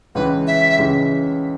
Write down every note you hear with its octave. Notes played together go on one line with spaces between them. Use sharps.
C#2 C#3 E3 B4
E5
C#2 C#3 E3